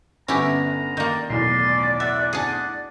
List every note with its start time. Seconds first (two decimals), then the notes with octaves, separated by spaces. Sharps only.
0.28 G1 B3 C#4 E4 G4 G#5 A#5
0.97 D#3 A#3 D5 G6
1.30 B1 E2 A2 D5 C6
2.00 E5 F#5
2.33 D4 G#4 D5